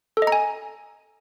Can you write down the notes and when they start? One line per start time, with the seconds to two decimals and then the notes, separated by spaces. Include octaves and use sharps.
0.17 A4
0.22 D#5
0.27 A#5
0.32 G#5